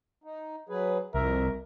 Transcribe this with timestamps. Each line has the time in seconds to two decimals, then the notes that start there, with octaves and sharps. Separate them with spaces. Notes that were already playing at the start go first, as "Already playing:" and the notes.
0.24 D#4
0.69 F#3 G#4 B4
1.14 C2 F2 A#4 E5